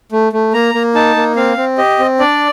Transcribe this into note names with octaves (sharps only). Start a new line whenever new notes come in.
A3
A3
A#3 A#5
A#3
D#4 A5
A#3
C4 F5
C4
G4 D#5
C4
D4 D5